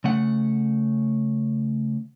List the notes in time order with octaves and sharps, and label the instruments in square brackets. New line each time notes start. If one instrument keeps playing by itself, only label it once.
[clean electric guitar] C#3 A3 F#5